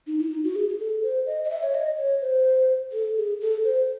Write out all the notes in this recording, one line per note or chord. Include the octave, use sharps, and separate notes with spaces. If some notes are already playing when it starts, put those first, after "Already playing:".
D#4
E4
D#4
F#4
G#4
G#4
A4
C5
D#5
D#5
E5
C#5
D#5
C#5
C5
A4
G#4
A4
C5